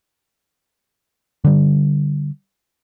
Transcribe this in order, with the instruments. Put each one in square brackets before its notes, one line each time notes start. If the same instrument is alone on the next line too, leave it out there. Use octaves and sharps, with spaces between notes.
[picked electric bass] D3 G3